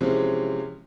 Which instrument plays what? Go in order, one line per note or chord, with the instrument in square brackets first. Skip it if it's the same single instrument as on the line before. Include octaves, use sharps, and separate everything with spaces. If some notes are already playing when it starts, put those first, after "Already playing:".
[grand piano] C3 E3 F3 G#3 C#4